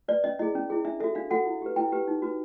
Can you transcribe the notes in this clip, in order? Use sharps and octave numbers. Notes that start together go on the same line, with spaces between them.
B4 D5
C#4 D#5
E4 G#4 D#5
C#4
E4 G#4
D4 E5
F#4 A4 E5
D4 F5
F#4 A4 F#5
E4
G4 B4
E4 G5
G4 B4
D#4
F#4 B4